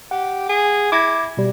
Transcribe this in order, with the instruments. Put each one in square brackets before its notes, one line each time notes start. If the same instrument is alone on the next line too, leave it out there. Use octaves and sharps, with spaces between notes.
[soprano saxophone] G4 [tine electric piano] F#5
[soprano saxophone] G#4
[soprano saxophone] E4 [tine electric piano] D6 G#6 A#6
[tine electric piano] B2 G3